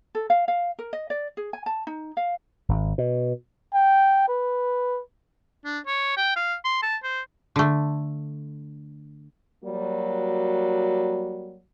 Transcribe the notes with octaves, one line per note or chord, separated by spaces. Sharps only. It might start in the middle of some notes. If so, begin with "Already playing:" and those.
A4
F5
F5
A#4
D#5
D5
G#4
G#5
A5
D#4
F5
G#1
B2
G5
B4
D4
C#5
G5
F5
C6
A5
C5
D3 A3
F#3 G3 A#3 F#4